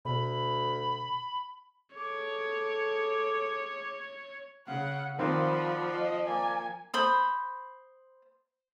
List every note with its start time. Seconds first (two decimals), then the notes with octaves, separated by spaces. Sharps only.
0.05 D2 B2 B5
1.95 G#4 A4 C#5 D6
4.67 C#3 F5 F#5
5.19 D#3 F3 C4 D5 F5 F#5 B5
5.94 D#5
6.27 A#3 D5 G#5
6.94 C5 B5 D#6